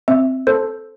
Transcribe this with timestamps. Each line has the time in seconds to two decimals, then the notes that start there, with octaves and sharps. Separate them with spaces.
0.08 C4 E5
0.47 A4 C5